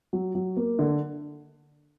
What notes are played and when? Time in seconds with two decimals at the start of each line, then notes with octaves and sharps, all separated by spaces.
0.13 F#3
0.35 F#3
0.57 A#3
0.79 D3